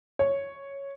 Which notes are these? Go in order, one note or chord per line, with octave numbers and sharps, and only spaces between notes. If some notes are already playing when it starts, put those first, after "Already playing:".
C#5